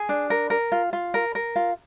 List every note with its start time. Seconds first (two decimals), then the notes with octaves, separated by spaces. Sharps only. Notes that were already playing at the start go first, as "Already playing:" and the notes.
Already playing: G#4
0.09 D4
0.30 A#4
0.50 A#4
0.72 F4
0.93 F4
1.14 A#4
1.35 A#4
1.56 F4